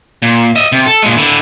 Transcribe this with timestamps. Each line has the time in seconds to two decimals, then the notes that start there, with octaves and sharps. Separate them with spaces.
0.22 A#2
0.56 D#5 E5
0.72 C3
0.86 A4
1.02 A#2 G#3
1.17 D3 E4